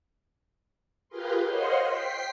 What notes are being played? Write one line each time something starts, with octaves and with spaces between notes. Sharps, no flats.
F4 G4 G#4 A#4 B4 C6
C5 C#5 D#5 F5 F#5 C6
G5 B6 C7